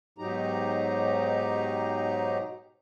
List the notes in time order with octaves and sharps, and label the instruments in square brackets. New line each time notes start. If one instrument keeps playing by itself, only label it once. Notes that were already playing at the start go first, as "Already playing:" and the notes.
[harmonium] G#2 B2 F#3 D#4 G4 A#5